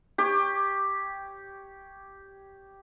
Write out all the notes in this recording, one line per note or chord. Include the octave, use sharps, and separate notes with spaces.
G4 C#5